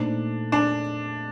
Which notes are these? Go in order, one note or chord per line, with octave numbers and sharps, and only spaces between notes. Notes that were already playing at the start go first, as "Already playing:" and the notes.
Already playing: A#2 A3 D4 D#4 A4 C5
D4